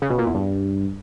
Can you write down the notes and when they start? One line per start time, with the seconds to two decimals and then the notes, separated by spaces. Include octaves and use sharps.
0.02 C#3
0.10 B2
0.18 A#2
0.26 E2
0.35 G2